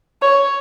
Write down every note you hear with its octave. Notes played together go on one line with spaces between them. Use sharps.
C#5